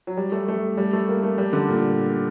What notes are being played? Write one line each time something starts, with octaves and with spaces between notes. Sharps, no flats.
F#3
G3
A3
A3
G3
A3
A#3
A3
G3
D3
A#2